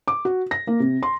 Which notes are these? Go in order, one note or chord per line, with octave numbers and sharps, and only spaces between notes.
D6
F#4
A#6
A#3
C3
C6